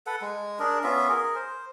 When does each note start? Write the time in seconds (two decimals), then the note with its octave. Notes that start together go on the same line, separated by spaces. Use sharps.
0.07 A4 B4 F#5
0.22 G#3
0.59 D4 G#4 A#4
0.84 B3 C#4 F4 E5
1.09 G#4 A#4
1.35 C5